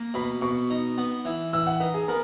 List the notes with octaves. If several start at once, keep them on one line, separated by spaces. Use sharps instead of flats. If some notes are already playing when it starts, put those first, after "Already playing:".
Already playing: A#3
B2 B5
B2 C#6
D#4
B3
E3
E3 E6
F#5
D#4 B4
G#4
B3 A#4